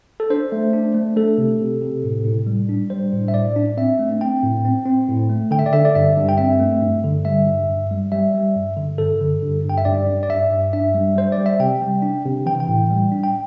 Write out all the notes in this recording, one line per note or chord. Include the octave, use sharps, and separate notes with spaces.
A4
D4 C5
A3
D4
A3
A3 A4
C3
C3
C3
A2
A2
G3
D4
G3 C5
A2
E5
A2 D5
D4
C4 E5
A3
C4 G5
A2
C4
C4
A2
A3
D3 G5
E5
D5
D3 E5
D5
G2 E5
G2
G5
C4 E5
A3
G2
D3
G3 E5
G2
G2
G3
G3 E5
G3
G2
D3
G2 A4
D3
G2
G2
G5
E5
G2 D5
G2
D5
G2 E5
G2
D4 E5
G3
G3 C5
D5
G3
E5
C3 G5
G3
D4
C3
E3 G5
G5
A2
G3
D4
G5